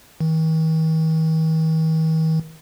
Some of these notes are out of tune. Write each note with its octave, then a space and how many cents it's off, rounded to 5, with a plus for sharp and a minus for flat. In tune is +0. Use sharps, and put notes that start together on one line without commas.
D#3 +45